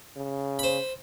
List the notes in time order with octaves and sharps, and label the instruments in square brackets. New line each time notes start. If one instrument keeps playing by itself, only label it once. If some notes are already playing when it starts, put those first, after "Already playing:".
[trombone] C#3
[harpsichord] C5 B5